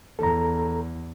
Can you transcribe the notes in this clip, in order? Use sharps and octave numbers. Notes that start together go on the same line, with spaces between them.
E2 A4 A#5